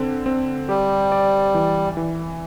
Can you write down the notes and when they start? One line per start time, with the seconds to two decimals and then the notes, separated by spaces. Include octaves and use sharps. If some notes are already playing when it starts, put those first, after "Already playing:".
Already playing: D3 C4
0.26 C4
0.69 G3 G4
1.12 D5
1.55 E3
1.97 E3